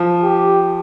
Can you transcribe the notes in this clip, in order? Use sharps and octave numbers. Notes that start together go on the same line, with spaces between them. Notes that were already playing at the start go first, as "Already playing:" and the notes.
Already playing: F3
G4